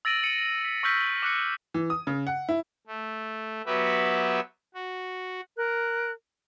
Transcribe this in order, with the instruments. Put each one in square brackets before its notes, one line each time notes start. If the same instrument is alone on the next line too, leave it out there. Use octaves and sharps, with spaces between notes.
[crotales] E6 A6 A#6 D7 D#7 F#7
C#7 D#7
B6
C#6 E6 F6 G6 B6
D6 F#6 C#7
[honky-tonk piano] E3
D#6
C#3
F#5
E4
[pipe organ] A3
F#3 B3 F#4 G4 B4 E5
F#4
[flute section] A#4 F#6